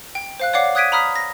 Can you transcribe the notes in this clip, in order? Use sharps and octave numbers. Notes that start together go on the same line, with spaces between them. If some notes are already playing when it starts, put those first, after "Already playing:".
G5
C5 F5 F#6
C#5 D5 F5 F#5 D6 C7
D#6 F#6 G#6 B6 D7 D#7
A#5 B5 D#6 F6 B6
A#6